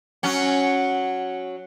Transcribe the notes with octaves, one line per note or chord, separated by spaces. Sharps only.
F#3 C#4